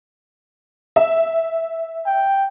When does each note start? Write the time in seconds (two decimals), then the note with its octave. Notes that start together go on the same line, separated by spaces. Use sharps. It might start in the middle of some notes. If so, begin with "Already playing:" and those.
0.96 E5
2.06 G5